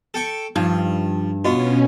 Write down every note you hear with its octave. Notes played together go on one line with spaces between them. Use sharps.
A4 G5 C#6
G2 F3 D#4
B2 B3 C#4 F4 F#4 D#5 C#6